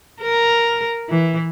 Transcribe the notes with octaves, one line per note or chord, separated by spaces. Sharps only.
A#4
E3